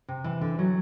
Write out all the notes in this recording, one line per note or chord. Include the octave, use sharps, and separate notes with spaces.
C3
E3
D3
F#3